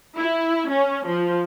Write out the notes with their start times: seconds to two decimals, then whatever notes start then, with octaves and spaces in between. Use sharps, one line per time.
0.17 E4
0.70 C#4
1.06 F3